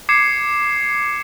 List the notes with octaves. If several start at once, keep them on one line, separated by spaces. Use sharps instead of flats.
D6 G#6 C7 C#7 E7